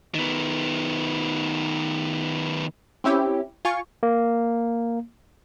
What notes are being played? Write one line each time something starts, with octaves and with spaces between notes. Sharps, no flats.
D#3 B3
C4 C#4 E4 G4
F4 G#5 C#6
A#3